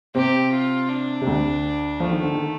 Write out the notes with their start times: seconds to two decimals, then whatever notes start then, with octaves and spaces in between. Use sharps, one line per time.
0.15 C3 C4 G4
0.52 F4
0.89 D4
1.21 C3
1.26 D2 D3
2.00 F3 A3
2.12 D#3
2.23 D3
2.34 D#3